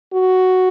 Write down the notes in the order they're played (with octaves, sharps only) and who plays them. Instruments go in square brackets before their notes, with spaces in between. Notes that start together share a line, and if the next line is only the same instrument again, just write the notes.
[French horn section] F#4